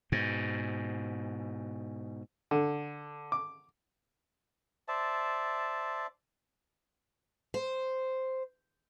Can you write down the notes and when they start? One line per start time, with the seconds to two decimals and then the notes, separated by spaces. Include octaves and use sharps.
0.12 G#2 B2
2.51 D3
3.32 D6
4.88 C5 D5 E5 A5
7.54 C5